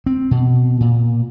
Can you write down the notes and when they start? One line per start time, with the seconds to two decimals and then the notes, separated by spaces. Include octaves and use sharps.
0.06 C4
0.31 B2
0.81 A#2